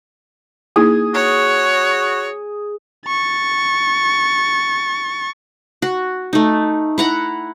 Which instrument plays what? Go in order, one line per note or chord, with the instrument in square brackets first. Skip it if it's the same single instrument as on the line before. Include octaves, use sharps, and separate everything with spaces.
[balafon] A#3 D#4 E4 [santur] G#4
[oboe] F#4 [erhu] C#5
[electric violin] C#6 A6
[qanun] F#4
A3 D#4
E4 F#5 A#5